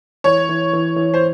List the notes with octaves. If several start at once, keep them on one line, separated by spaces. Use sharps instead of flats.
E3 C#5
E3
E3
E3
C5